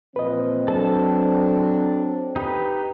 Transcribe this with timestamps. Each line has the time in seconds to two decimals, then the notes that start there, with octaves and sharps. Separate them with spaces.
0.16 A#2 E3 F3 C4 B4 D#5
0.68 F#3 D4 A4 A5
2.36 D#4 G4 B4